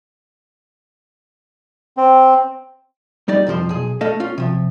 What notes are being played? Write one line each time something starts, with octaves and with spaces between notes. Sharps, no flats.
C4
G3 D#4 D5
C2 F2 F3 C5
B1 G#4
A3 A4 D#5 F5
C#4 F4
C3 F3